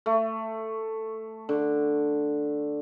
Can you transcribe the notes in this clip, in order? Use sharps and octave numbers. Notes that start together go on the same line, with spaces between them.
A3
D3